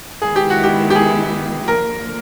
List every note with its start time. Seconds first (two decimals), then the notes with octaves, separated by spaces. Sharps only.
0.22 D#3 G#3 B3 E4 G#4
0.36 G4
0.50 F#4
0.63 G4
0.90 G4
0.95 G#4
1.67 D3 F3 A#3 A#4